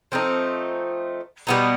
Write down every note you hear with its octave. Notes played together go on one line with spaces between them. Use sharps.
F3 A3 C4 D#4
B2 G3 B3 D#4